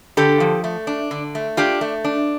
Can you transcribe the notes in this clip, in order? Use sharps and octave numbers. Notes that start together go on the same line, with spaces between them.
D3 G4 A4
F3
A3
D4
D3
A3
D4 F4 G4
A3
D4